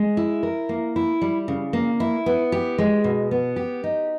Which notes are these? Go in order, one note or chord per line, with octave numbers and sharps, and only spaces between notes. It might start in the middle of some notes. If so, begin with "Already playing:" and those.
Already playing: G#3
E4
A#4
A#3
E4
G3
C#3
A#3
E4
B3
G4
G#3
B2
B3
G4
D#4